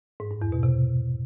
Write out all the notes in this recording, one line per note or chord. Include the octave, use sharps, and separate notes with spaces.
G#2
G2
E2
B2
C3